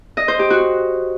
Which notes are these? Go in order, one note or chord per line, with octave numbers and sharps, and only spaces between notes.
D#5
C5
G4
F#4